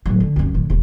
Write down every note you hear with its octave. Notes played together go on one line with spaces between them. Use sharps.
A2 F#3
D3
C2 F#2
A2 D3
E1 C3